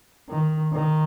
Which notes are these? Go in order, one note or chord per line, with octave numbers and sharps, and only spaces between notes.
D#3
D#3